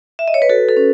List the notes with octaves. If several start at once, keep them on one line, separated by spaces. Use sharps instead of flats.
E5
D#5
C#5
B4
F#4 A4
A4
C#4